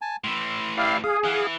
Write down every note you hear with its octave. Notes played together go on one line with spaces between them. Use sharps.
G#5 A5
A2 E3 C6
E4 G4 D5 F5
G#4 F5
E3 F5 F#5 F#6